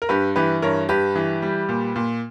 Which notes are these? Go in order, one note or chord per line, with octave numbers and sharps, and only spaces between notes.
A#4
G2 G4 B4
E3 G4 B4
G2 A#4 C#5
G2 G4 B4
E3
G3
A#2
A#2